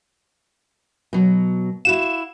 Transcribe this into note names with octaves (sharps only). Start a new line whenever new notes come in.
B2 F#3
E4 F#4 F5 E7